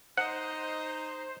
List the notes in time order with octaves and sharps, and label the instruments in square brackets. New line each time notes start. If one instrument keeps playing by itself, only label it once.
[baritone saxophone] D#4 [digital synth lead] C5 [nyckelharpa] D#5 [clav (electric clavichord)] F#5